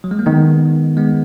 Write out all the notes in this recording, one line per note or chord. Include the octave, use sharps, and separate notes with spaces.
F#3
G#3
A#3
D#3 G#3 B3
G#3 B3